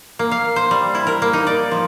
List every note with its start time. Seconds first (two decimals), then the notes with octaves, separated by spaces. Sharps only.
0.19 A#3
0.31 F5
0.56 C5
0.71 G3
0.95 E4
1.07 A#4
1.22 A#3
1.33 D#4
1.47 D5
1.71 F3